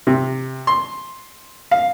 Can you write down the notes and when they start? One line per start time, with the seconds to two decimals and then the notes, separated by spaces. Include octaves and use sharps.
0.07 C3
0.67 C6
1.71 F5